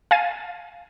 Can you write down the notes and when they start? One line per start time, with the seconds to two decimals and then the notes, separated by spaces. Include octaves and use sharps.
0.11 F5 G#5 A6 C7 D#7